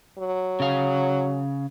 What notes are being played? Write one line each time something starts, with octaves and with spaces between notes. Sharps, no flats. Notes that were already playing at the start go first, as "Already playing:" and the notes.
F#3
C#3 F5